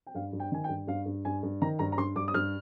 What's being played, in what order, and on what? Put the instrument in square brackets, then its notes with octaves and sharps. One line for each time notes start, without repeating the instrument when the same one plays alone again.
[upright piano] G5
G2 F5
G2
G5
D#3 G#5
G5
G2
G2 F5
G2
G2 G#5
G2
D#3 A#5
G2 A#5
A#5
G2 C6
G2 D6
D#6
G2 F6